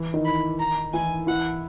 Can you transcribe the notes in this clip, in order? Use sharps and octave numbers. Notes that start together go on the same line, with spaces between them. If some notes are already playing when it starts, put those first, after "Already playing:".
Already playing: E3 E4
D#3 D#4
B5
A#5
E3 E4 G#5
E3 E4 F#5